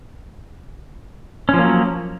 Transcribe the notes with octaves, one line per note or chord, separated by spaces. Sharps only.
F3 F#3 A#3 C#4